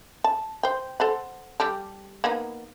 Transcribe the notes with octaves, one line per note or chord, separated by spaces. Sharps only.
A5
C5 G5
A4 C5 F#5
G3 G4 A4
A#3 B3 D#4